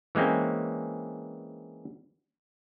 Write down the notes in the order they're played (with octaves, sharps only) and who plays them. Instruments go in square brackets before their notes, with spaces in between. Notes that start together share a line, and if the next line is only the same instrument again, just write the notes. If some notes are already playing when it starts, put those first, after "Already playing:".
[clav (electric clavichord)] E3 G#3 A#3 C4 C#4